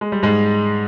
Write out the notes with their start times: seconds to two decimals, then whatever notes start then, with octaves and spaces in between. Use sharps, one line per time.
0.01 G#3
0.12 G3
0.23 G#2 G#3